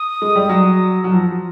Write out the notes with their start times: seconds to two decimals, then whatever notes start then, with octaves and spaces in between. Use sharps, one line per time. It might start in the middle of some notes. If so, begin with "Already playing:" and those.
Already playing: D#6
0.22 G#3
0.35 G3
0.49 F#3
1.04 F#3
1.12 F3